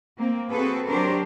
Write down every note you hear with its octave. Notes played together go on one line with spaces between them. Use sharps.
A#3 C4
C4 F#4 G#4 A4 B4
F#3 D4 G4 A#4 C5